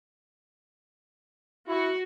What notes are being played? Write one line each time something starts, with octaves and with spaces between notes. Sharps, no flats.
E4 F#4